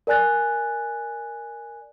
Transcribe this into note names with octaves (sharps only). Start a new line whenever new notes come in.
A#4 D5 G#5 F#6 A6